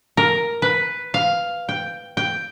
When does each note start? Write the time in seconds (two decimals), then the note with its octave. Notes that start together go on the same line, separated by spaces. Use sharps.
0.17 A#4
0.62 B4
1.14 F5
1.69 G5
2.17 G5